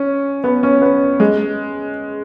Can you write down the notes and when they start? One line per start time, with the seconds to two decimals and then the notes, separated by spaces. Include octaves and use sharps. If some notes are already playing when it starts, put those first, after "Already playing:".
Already playing: C#4
0.44 B3
0.63 C#4
0.82 B3
1.20 G#3